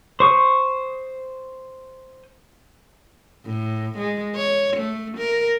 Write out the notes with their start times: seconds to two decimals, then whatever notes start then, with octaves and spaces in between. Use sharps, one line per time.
0.20 C5 C#6 D#6
3.46 A2
3.98 G#3
4.36 C#5
4.77 A3
5.18 A#4